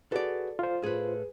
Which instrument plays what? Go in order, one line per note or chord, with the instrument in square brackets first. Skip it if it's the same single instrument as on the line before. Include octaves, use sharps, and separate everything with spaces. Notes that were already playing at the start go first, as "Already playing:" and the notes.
[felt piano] F#4 G#4 B4 [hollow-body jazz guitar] A4 D5
[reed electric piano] F4 C5 [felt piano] F5
[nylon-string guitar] A2 B4 [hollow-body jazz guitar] G#4